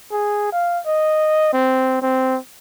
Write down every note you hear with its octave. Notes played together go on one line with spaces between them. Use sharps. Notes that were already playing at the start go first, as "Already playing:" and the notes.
G#4
F5
D#5
C4
C4